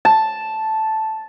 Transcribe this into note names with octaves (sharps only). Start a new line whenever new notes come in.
A5